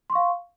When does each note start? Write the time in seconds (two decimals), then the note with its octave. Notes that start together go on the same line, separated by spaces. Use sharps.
0.10 C6
0.12 C#6
0.15 F5